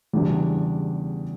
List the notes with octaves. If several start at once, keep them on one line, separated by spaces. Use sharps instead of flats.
E2 C#3 G3 D4 F#4